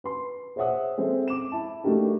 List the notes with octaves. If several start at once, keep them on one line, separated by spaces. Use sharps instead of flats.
B4 C6
G#4 C5 C#5 E5 F#5 D#6
G#3 C4 G#4 A4 C5 E5
D6 E7
E4 A5
A3 D4 D#4 F#4 G4 A#4